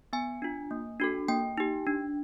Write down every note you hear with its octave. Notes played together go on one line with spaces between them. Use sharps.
B3 G#5
D4 F4
A#3
D4 F#4 A4
A#3 G5
D#4 G4
D4